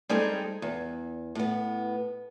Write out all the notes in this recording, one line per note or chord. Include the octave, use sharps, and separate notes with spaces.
G3 G#3 C4 D#4 G#4 A4
E2
A2 B3